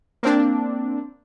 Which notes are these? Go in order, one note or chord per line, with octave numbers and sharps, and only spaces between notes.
A#3 C4 D4